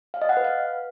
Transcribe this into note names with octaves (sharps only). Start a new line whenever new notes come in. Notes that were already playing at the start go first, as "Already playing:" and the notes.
F5
D#5
F#5
B4
F5